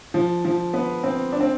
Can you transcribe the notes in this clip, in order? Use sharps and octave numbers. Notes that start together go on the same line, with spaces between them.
F3
F3
B3
C4
D4
C4